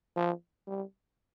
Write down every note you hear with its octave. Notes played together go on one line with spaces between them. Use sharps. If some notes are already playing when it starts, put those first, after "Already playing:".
F3
G3